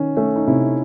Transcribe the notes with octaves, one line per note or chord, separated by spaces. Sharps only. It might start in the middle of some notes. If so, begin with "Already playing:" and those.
Already playing: D#3 C#4
A3 C#4
D#4
C3 E4